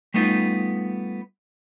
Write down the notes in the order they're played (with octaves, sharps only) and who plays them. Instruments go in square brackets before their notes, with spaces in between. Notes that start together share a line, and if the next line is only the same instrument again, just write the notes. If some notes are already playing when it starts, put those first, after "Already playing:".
[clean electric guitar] G3 A3 B3 D#4 F4